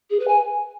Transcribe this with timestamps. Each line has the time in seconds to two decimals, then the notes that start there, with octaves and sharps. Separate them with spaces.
0.10 G#4
0.20 B4
0.28 G#5